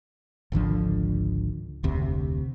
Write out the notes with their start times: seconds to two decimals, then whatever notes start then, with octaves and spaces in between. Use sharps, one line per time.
0.52 G#1 C#2 D3 F3
1.83 F1 D2 C3